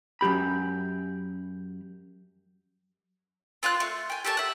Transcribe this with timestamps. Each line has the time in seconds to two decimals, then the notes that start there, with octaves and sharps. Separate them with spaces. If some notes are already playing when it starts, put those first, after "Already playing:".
0.21 F#2 A#2 G4 B5
3.63 C4 F4 G#5 F#6
3.80 A3
4.10 G5 G#5
4.25 G4 A4 C#5 A5
4.37 E5 F#5